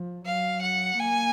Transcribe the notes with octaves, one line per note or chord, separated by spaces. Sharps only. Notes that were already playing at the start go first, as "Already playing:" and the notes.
Already playing: F3
F#3 F5
F#5
A#3 G#5